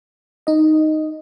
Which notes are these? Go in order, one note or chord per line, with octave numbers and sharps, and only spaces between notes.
D#4 D#5